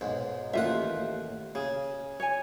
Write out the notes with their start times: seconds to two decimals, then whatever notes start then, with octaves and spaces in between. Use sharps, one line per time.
0.01 B1 G#2
0.54 A1 D#2 F4 E5 F#5
1.55 C#3 G#4
2.20 C#5 G#5